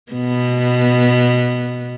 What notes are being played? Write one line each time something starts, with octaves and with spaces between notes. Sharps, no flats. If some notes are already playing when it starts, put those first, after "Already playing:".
B2 B3